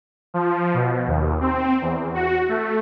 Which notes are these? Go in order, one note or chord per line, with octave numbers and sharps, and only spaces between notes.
F3
B2
D#2
C4
E2
F#4
A3